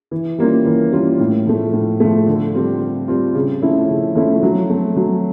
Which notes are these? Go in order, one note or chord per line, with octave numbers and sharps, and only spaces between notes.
E3
G3 A#3 C#4 F4
E3
G3 A#3 C#4 F4
A2
F3 A3
A2
F3 A3
D3
G3 C4 F4
D3
G3 C4 F4
C#3
F3 A3 C#4 E4
C#3
F3 A3 C#4 E4
F#3
A3 C4
F#3